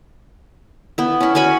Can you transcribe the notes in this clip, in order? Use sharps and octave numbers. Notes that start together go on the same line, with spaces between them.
B3 E4
C#4 E4
C#4 F#4 G#5 B5